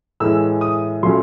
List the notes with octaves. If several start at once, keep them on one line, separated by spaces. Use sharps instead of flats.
A2 E3 G#3 E6
D#6
A#2 F#3 A3 C#4 C6